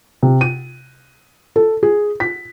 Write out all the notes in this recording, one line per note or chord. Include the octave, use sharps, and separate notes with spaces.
C3
D#7
A4
G#4
B6